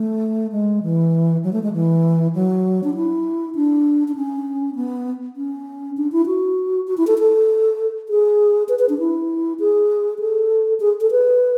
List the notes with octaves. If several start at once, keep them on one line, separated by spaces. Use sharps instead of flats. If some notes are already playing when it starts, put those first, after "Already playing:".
Already playing: A3
G#3
E3
F#3
A3
G#3
E3
F#3
D4
E4
D4
D4
C#4
B3
C#4
D4
E4
F#4
F#4
E4
A4
A4
G#4
B4
B4
D4
E4
G#4
A4
G#4
A4
B4